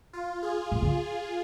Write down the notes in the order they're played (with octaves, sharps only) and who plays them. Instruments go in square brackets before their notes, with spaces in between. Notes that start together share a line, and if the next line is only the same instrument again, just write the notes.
[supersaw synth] F4
G#4
[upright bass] A#2
D3